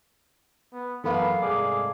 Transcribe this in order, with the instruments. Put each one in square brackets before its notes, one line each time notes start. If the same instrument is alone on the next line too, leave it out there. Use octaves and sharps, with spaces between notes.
[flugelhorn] B3
[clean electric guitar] F#2 E3 [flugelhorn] B3 [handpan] A4 A#4 F5
[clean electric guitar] C2 G#2 D5 [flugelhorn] G#4